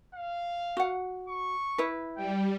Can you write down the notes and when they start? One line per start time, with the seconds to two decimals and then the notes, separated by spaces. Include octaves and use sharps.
0.15 F5
0.77 F#4 F#5
1.29 C#6
1.78 E4 B4
2.17 G3 G5